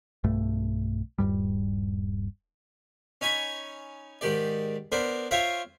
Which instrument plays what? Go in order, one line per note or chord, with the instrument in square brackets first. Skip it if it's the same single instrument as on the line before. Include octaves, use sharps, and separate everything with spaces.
[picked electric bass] B1 G2 A3
D#1 E2 G2 G3
[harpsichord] C#4 D#4 G#5 B5 C#6
G#2 D#3 G4 D5
B3 D4 A#4 C5
F4 C5 C#5 E5 F5 G5